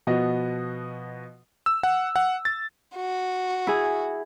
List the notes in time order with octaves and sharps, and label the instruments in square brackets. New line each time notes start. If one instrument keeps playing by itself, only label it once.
[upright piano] B2 F3 B3 F#4 D#5
[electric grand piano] E6
F#5
F#5
A6
[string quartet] F#4
[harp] E4 G#4